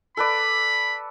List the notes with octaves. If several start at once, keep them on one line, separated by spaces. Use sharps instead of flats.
A4 B4 D5 B5